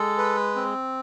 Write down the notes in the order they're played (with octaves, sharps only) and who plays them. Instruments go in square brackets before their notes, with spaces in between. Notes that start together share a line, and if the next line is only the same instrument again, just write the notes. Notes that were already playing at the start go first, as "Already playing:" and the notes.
Already playing: [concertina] G#3 A4
B4
C4